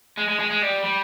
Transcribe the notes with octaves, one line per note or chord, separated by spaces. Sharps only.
G#3
G#3
G#3
G#3
G3
G3